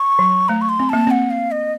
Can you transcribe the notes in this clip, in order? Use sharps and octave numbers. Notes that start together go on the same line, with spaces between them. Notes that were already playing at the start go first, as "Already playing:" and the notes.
Already playing: C#6
F#3
A3 A#5
C#6
C6
C4
A#3 A5
C4 F#5
F5
D#5